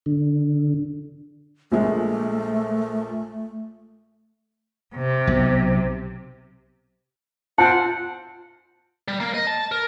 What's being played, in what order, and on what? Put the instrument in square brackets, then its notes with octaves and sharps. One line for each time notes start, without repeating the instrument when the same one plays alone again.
[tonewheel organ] D3
[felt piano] A#1 A#2 G#3 [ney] A3
[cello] C3
[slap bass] B1
[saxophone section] C4 F#5 [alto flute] F4 [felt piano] A5
[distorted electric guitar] G3
A#3
D#5
A5
A#4